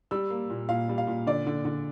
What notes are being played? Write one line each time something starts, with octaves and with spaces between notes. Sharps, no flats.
G3 E6
A#3
A#2
A#2 F5
G3
F5
A#2
D3 D5
D3
D3